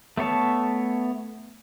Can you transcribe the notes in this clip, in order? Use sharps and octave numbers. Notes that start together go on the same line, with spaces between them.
A3 B3 C#5 A5